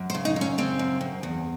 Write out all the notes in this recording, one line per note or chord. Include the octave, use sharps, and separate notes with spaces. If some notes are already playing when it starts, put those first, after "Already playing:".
Already playing: F#2
C5
C#3
D#4
F#2
C#4
C#3 C4
F#2
F#2
E2